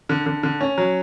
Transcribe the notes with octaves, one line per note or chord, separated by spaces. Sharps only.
D3
D3
D3
C#4
F#3